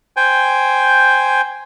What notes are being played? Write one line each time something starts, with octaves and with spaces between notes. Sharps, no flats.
C5 G5 G#5